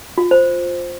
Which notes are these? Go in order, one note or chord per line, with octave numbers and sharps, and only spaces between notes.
F4
C5